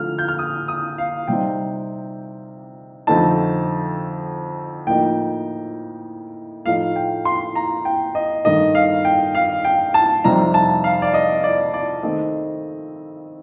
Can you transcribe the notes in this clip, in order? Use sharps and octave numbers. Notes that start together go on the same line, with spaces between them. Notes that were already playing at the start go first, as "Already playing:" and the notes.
Already playing: D3 F3 A3 F6
G6
F6
D#6
D#6
F5
C3 G3 C4 D#4 G5
F2 D3 A3 C4 D#4 A5
A2 F3 A#3 D#4 G5
A2 F3 A3 D#4 F5
G5
C6
A#5
G5
D#5
G2 D#3 A3 D#4 D#5
F5
G5
F5
G5
A5
F2 C3 G3 C4 D#4 A#5
A5
F5
D5
D#5
D5
D5
D#3 A3 C4 D#5